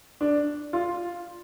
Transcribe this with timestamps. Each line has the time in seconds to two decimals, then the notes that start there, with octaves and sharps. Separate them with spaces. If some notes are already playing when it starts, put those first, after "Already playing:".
0.21 D4
0.73 F4